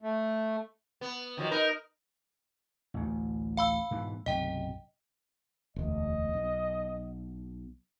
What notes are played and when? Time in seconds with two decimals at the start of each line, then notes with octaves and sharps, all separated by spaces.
0.02 A3
1.01 B3
1.37 D#3 F3 F#3
1.51 D#4 A#4 B4
2.94 A1 D2
3.57 F5 B5 E6
3.91 G#2 B2 E3
4.26 B1 F#2 C3 D#5 G5
5.76 E1 D2 D#5
6.34 B1